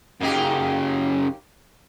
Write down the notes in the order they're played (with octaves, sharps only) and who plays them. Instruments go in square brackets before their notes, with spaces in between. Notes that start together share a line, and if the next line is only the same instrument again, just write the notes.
[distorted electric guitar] F#2 C#3 [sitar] A#3 D#4 G4